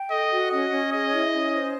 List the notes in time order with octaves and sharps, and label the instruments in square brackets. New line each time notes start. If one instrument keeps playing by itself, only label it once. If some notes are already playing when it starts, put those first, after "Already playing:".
Already playing: [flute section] G5
[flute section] A4 [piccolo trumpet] D#5
[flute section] F#4
[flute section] C#4 [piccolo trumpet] D#5
[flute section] C#4
[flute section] G#4 [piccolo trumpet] D#5
[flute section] E4
C#4
C5